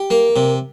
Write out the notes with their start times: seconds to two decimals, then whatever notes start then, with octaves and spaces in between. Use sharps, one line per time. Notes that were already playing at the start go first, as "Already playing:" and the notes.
Already playing: G4
0.10 A#3
0.36 C3